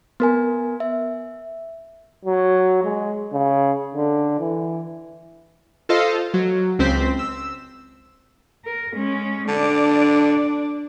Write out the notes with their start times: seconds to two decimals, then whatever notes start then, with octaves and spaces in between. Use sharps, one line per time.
0.20 B3 A#4 G#5
0.80 E5
2.25 F#3
2.84 G#3
3.32 C#3
3.94 D3
4.39 E3
5.89 F4 A4 C5 D#5 F5
6.34 F#3
6.79 C#2 C4 C5 B6
7.19 E6
8.65 A#4
8.94 G#3 C#4
9.48 D3 D4 D5